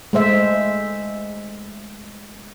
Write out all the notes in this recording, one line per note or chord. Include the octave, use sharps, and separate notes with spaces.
G#3 A3 C5 E5